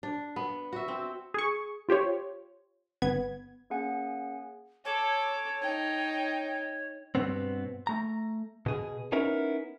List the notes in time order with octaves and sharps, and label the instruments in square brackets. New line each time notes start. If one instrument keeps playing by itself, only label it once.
[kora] D4
B3
F#4 E5
C4
[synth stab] G#4 C#6
F4 G4 C5 C#5
G1 B3 G#6
[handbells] A#3 C#4 G#4 F#5 G#5
[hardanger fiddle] A4 D6 [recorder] C#5
[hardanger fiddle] D#4 G5
[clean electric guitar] G2 B2 B3 C4
A3 A#5
B2 G#4
B3 C#4 D#4 E4 A#4